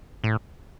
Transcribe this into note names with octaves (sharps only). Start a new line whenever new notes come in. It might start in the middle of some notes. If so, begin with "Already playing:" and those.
A2